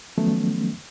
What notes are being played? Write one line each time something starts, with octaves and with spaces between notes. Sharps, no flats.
D#3 F3 F#3 A3 B3 C#4